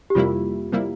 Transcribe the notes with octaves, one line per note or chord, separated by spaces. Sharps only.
G4
F2 C3 G3 A#3 E4 F4
C3 G3 A#3 E4